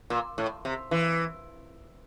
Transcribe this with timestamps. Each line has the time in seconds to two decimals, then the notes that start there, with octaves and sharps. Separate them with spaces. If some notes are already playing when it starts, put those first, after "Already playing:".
0.10 A#2
0.38 A2
0.65 C3
0.91 E3